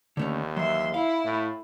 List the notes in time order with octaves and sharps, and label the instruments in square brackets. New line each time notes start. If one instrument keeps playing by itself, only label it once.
[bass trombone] D#2 [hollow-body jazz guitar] D3 A3 C#4
[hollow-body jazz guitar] E3 F#3 [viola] E5 C6
[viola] E4 [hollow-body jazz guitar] F5
[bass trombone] A2